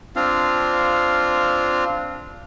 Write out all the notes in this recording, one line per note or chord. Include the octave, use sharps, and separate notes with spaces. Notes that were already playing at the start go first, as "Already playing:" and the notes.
C4 D4 F4 F5